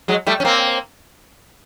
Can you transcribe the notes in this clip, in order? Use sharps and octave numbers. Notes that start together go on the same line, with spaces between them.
F#3 G#3
G3 A3
C#4
A#3 C4